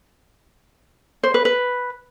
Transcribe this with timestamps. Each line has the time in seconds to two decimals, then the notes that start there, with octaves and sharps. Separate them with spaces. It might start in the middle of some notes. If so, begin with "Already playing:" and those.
1.23 C5
1.34 B4
1.45 B4